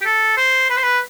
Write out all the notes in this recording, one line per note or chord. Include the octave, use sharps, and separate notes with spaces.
G4
A4
C5
B4
C5
B4